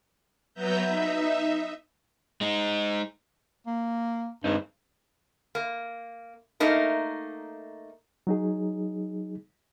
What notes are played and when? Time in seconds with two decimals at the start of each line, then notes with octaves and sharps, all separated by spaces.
0.54 F#3 B3 B4 E5 A#5 G6
0.86 D#4 E5
2.41 G#3 D#4
3.67 A#3
4.44 G2 G#3 C4 D#4
5.55 A#3
6.60 A3 A#3 D#4 A#4
8.27 F#3 D#4 G#4